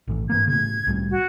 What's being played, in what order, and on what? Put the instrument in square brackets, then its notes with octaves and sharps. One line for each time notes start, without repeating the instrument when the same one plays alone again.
[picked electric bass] A#1 A2 E3
[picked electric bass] G#2 E3 A#3 [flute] G#6
[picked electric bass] A2 C#3 [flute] G#6
[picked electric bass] C2 A2 G3
[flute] F#4